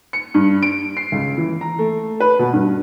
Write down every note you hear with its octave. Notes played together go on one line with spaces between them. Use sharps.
C#7
G2
D7
C7
C#2
E3
A#5
A3
B4
B2
G2